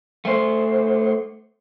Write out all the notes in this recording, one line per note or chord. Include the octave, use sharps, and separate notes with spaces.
A3 C5